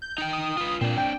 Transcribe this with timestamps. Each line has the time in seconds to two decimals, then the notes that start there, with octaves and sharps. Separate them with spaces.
0.02 G6
0.18 D#4 G5
0.33 D#6
0.58 F4 B4
0.81 A#2 C4 D4
0.98 G5